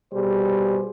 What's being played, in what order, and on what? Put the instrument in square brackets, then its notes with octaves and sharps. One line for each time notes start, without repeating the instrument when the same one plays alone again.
[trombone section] B2 G3 G#4 C5